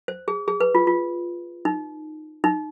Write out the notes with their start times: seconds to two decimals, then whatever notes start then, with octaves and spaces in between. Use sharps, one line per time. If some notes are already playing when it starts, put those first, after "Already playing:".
0.08 C5
0.28 G#4
0.48 G#4
0.60 B4
0.75 F4
0.87 F4
1.65 D#4
2.44 D#4